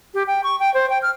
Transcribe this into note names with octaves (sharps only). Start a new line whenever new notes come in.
G4
G5
C#6
G5
C5
G5
F6